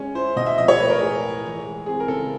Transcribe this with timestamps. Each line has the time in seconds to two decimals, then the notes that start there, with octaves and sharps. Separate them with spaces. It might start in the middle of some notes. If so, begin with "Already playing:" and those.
Already playing: G#3 C#4
0.14 E4 C5
0.36 B2 D#5
0.46 E5
0.58 F3 D#5
0.68 C#5
0.79 A3 B4
0.90 A#4
1.01 A2 G#4
1.22 A2
1.44 E3
1.65 G#3
1.86 C4 G#4
2.00 A#4
2.08 C#3 A4